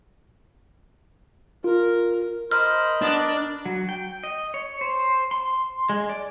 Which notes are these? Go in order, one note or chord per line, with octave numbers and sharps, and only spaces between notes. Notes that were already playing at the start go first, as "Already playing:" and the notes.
F4 A#4
A#4 C5 D#5 B5 F6
B3 D4
D5
F#3
G5
D#5
C#5
C5
C6
G#3
D5